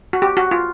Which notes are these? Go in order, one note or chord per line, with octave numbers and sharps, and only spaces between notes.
F#4
G4
F#4
F4